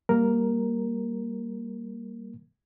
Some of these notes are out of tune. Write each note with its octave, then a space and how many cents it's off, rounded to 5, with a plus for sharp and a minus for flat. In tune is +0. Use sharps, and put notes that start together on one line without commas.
G3 +0 A#3 +0 A#4 +0